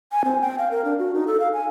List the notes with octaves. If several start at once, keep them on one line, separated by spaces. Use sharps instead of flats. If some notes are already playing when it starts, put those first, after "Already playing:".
G#5
C4
G5
F5
A#4
D4
F#4
D#4
A4
F5
G#5